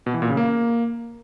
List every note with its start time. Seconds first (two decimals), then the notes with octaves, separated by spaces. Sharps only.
0.06 B2
0.14 E3
0.22 A#2
0.30 C#3
0.37 A#3